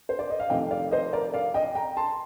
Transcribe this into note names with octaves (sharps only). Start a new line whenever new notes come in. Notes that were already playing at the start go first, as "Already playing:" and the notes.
C5
D5
D#5
F5
F2 C3 D#3 A3 D#5 G5
D5 F5
C5 D#5
A#4 D5
D5 F5
D#5 G5
G5 A#5
A5 C6